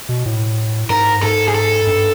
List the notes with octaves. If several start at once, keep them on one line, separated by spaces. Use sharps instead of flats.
B2
A2
G#2 A#4
G#2 A4
G#4
A4
G2